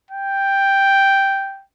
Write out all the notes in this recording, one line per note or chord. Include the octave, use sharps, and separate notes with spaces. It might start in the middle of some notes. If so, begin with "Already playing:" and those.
G5